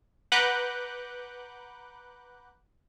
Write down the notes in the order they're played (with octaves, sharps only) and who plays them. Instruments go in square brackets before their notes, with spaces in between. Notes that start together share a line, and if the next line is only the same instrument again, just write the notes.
[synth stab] B4 F#5 A#5 D6 F#6 G6